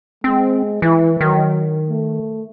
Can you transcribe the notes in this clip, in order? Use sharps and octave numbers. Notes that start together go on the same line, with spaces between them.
G#3 C4
E3 E4
D#3 F#3
A3